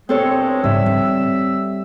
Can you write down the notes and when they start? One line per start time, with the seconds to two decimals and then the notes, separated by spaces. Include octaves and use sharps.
0.09 G2 B2 G#3 C4 A4 C#5
0.64 G#2 C#3 G3 E5 E6
0.86 C4